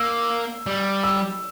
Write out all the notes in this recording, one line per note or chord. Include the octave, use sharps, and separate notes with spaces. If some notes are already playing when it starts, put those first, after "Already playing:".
Already playing: A#3 E6
G3
E6